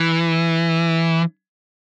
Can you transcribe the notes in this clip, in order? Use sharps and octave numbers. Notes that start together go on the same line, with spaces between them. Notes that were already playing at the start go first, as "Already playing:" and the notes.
Already playing: E3